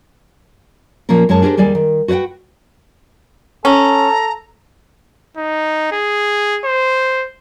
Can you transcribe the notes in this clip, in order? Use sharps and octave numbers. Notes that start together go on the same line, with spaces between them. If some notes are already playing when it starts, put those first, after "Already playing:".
A#2 F3 A#3 C#4 A#4
F#2 G#3 C#4 C#5 A5
D4 G4 G#4 A#4 C5
D#2 G3 G#4 D5 G#5
D#3
F#4 B4 C#5 F#5 G5
C#4 A4 A#5
D#4
G#4
C5